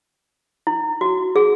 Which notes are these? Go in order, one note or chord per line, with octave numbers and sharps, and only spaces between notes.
E4
F#4
G#4